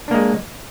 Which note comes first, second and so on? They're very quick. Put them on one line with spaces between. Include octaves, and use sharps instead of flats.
D4 A#3 G#3